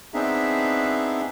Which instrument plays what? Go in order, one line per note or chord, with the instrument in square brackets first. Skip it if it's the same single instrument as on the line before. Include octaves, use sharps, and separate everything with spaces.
[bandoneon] B3 C4 D4 D#4 G#4 E5